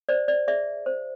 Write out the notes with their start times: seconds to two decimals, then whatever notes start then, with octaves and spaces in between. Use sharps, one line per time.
0.09 C5 D5
0.28 D5
0.47 G#4 D5 E5
0.86 C5